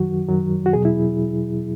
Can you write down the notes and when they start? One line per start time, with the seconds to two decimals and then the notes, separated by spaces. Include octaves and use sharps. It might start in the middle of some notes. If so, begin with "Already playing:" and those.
Already playing: F#2 D#3 F#3 F#4
0.28 F#2 D#3 F#3
0.66 F#4
0.73 E2 B2 F#3 G#4
0.85 E4